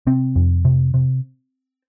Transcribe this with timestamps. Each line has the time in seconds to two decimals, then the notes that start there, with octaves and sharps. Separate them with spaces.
0.07 C3 C4
0.36 F2
0.65 C3
0.94 C3